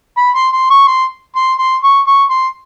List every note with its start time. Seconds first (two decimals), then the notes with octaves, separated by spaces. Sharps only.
0.17 B5
0.35 C6
0.53 C6
0.70 C#6
0.88 C6
1.36 C6
1.59 C6
1.84 C#6
2.07 C#6
2.30 C6